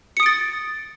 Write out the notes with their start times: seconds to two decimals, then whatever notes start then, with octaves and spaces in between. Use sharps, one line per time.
0.17 C#7
0.20 D#6
0.23 D7
0.26 A6